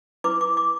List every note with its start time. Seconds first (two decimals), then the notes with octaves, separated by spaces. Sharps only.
0.24 E4 B4 D6
0.41 D6
0.57 D6